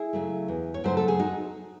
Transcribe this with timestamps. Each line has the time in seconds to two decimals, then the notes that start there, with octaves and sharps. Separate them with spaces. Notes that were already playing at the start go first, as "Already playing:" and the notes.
Already playing: E4 G#4
0.13 C#3 F#3 A3
0.48 E2
0.74 C#5
0.84 C#3 F#3 A3 C5
0.97 A4
1.08 G#4
1.20 D#4 F#4